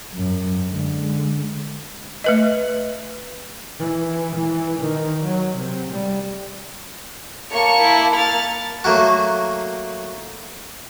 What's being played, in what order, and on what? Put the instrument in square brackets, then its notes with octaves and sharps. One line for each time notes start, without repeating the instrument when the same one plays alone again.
[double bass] F#2
D3 G#3
[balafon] A3 B4 D#5
[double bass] E3
E3
D#3
F#3
C3
G3
[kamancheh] A#3 A5 [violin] C#5 C#6
[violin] E4
F6 A6
[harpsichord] F#3 A3 A#3 F#4